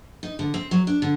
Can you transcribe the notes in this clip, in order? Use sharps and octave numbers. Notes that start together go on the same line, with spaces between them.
D#4
D3
C4
F#3
D4
D3